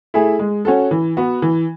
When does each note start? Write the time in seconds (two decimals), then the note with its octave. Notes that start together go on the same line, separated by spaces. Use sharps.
0.14 A3 E4 G#4
0.39 G#3
0.65 C#4 F#4 A4
0.91 E3
1.17 B3 F#4
1.42 E3